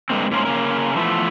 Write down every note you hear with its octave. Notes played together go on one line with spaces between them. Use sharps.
G2 G#3 A#3 C4
G#2 A#3 C#4 A#4 C5
C#3 A#3 C#4 A#4
E3 F3 G3 A3 B3